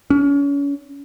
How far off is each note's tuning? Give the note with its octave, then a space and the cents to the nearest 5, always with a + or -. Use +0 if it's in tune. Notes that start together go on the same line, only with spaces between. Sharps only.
C#4 +35